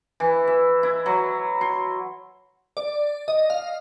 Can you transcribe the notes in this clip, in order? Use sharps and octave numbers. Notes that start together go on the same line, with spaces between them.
E3
E5
E4
F#3
C6
D5
D#5
F5